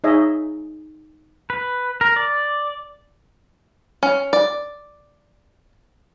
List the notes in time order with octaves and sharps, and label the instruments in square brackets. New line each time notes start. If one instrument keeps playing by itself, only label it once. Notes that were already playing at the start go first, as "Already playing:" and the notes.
[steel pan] D#4 G#4 C#5 D#5 E5
[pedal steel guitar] B4
A#4
D5
[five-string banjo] C#4
D5